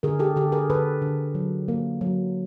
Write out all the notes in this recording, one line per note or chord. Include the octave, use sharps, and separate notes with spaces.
D3 G#4 A#4
G4 A4
D3 G4 A4
G#4 A#4
D3 A4 B4
D3
F#3
A#3
F#3